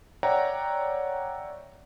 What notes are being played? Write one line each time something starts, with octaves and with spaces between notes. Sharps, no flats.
C#5 D5 E5 F#5 G5 A#5